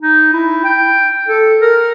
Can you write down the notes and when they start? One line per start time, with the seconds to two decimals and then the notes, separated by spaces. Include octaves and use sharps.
0.02 D#4
0.33 E4
0.64 G5
1.28 A4
1.61 A#4